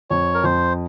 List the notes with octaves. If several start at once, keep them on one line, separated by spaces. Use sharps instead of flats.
F2 C#5
A#4
F2 C5